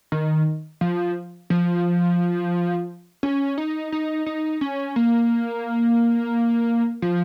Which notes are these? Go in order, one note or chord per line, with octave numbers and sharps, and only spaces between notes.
D#3
F3
F3
C#4
D#4
D#4
D#4
C#4
A#3
F3